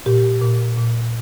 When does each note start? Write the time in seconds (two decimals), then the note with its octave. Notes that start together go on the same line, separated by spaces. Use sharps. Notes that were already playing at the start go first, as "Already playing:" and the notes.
0.06 A#2 G4
0.42 A#2
0.77 A#2